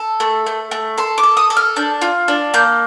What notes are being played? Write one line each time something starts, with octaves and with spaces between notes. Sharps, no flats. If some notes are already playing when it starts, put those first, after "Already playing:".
Already playing: A4
A3
A3
A3
A4 C6
D6
A4
D#6
A4
F6
D4 G6
F4
D4
A#3 G6